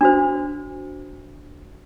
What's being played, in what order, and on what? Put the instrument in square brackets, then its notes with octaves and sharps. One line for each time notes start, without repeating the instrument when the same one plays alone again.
[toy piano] D4 F#4 C5